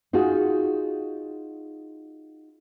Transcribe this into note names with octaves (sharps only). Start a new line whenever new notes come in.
D#4 F4 F#4 G#4